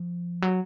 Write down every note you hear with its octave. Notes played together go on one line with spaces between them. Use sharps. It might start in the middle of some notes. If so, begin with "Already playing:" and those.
Already playing: F3
F#3